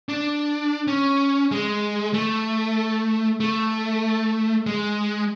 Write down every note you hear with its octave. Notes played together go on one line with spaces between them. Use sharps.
D4
C#4
G#3
A3
A3
G#3